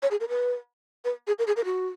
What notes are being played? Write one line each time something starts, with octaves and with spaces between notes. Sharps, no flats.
C#5
G#4
A#4
B4
B4
G#4
A#4
G#4
A#4
F#4